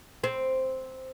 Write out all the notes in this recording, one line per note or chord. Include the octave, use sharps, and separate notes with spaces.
C4